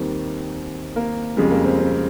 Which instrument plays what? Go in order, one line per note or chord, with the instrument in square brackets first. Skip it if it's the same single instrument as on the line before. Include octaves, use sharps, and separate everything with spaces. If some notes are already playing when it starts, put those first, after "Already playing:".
Already playing: [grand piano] D#2 D#3 G3 C4
A#3
F2 C#3 G3 G#3
A#3
C4
C4